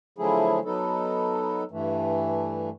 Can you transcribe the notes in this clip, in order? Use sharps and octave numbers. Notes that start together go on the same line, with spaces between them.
D3 F3 F#3 A3 E4 G#4
F#3 B3 D#4 A4
G2 E3 A3